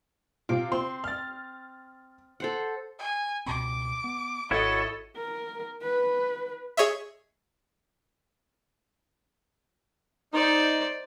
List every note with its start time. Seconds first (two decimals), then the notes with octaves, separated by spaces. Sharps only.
0.49 C3 F4 D6
0.72 C4 C6
1.04 F6 A6
2.40 A4 C5 F#5
2.99 G#5
3.46 C#2 B2 C4 D6
4.04 B3
4.51 G#1 E4 F#4 A4 C#5 D#5
5.16 A#4
5.82 B4
6.77 G#4 C#5 D#5 E5
10.34 D#4 C5 D5